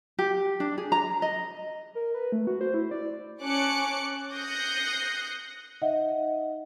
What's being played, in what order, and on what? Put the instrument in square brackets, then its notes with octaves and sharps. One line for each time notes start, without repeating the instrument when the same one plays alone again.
[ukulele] G4
D4
G#4
A#5
D#5
[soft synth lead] A#4
B4
A3
F#4
C5
E4
D5
[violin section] C#4 A5 C#6 D6 F#6 C#7
D#6 F#6 G6 A#6 C7 C#7
[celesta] D#4 D#5 E5 F#5